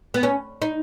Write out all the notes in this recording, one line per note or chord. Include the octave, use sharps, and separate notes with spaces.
B3
C#4
D#4